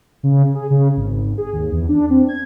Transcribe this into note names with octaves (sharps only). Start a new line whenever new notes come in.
C#3
G#4
C#3
G#1
G#4
D#2
E2
D4
C4
G#6